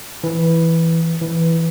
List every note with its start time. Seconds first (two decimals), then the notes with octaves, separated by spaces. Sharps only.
0.24 E3
1.21 E3